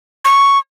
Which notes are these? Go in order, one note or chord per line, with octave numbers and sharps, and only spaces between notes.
C#6